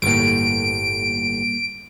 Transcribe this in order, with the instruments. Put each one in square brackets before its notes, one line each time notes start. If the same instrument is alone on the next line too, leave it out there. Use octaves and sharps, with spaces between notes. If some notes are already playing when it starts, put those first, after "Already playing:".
[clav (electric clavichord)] G1 A2 [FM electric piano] G3 A#3 [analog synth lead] D7